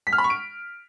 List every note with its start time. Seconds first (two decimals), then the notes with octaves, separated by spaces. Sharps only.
0.07 B6
0.13 F6
0.18 B5
0.24 C#6
0.30 D7